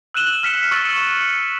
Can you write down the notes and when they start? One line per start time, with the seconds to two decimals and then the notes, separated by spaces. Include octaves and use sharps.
0.14 E6 F#6 D#7 E7 F#7 G7
0.43 F6 B6 C#7 E7
0.71 C#6 E6 A6 C#7 F#7